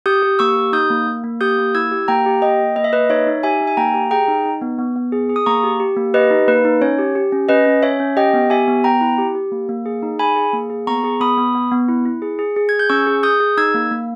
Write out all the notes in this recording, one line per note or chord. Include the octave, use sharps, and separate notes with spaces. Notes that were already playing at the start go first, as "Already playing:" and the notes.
G4 D#6 G6
G4
A#3 C#6 E6
G4
D#4 D#6 G6
A#3
A#3
A#3
G4 D#6 G6
A#3
E4 E6 G#6
G4
A#3 G5 A#5
G4
A#3 D#5 G5
A#3
A#3 D#5
E5
A#3 B4 D#5
D#4 C#5 E5
D#4
G4 E5 G#5
D#4
G#5
A#3 G5 A#5
G4
G#4 G5 A#5
D#4
D#4
B3
B3
B3
G#4
G#4
D#6
A#3 A#5 C#6
G4
G4
A#3
G4 B4 D#5
D#4
A#3 B4
D#4
C#4 C#5
G4
G4
C#4
C#4 B4 D#5
C#4
C#4 C#5 E5
C#4
G4 D#5 G5
B3
G4 E5 G#5
B3
B3 G5 A#5
E4
G4
G4
A#3
A#3
G#4
D#4
G#4 G#5 B5
G#4
A#3
G#4
B3 A#5 C#6
G#4
B3 B5 D#6
B3
B3
B3
E4
E4
G#4
G#4
G#4
G#4 G#6
G6
C#4 C#6 E6
G#4
G#4 D#6 G6
G#4
D#4 E6 G#6
A#3
A#3